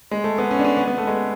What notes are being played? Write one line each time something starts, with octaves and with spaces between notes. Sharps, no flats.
G#3
A3
B3
C#4
D4
C#4
B3
B3
A3
G#3